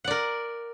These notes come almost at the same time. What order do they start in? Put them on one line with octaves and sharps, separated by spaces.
F#5 D5 A#4